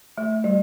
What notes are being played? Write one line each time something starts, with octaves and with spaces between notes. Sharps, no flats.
A3
G3